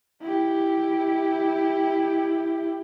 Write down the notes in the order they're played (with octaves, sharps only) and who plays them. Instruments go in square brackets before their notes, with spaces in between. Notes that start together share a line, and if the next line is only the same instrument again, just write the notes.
[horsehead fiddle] E4 G4